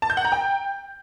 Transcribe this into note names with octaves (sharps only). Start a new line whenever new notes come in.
A5
G6
F#5
A#5
G5